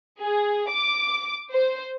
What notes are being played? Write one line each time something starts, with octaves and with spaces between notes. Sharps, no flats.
G#4
D6
C5